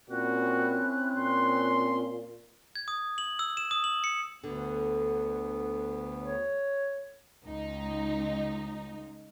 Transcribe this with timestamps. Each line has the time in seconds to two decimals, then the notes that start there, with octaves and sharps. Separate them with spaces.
0.10 A#2 C4 C#4 E4 F#4 F#6
1.16 A#2 C6
2.75 G#6
2.88 D#6
3.18 F#7
3.39 E6
3.57 E7
3.71 D#6
3.84 F#7
4.04 C#7
4.44 D2 D3 B3
6.22 C#5
7.46 C#2 D#4